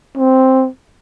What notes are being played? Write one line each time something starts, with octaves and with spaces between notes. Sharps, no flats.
C4